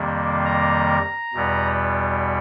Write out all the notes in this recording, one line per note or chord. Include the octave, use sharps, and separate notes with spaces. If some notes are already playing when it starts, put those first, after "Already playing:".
Already playing: F2 C3 D#3 G3 A#3
A#5
E2 B2 G3 B3